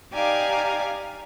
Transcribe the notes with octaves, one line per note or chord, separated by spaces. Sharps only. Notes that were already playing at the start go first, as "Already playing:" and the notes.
D#4 G4 D5 F5 G#5 A#5